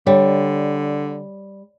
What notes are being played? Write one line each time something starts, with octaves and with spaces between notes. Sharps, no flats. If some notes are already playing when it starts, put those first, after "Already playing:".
D3 G3 C#5